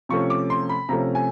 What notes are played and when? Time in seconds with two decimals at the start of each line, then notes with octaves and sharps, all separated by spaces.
0.09 C3 F3 A3 C#4 C#6
0.30 D6
0.50 C6
0.69 B5
0.89 C3 F3 A3 C#4 A#5
1.15 G#5